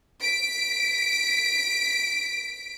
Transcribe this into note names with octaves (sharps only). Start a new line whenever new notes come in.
B6 D7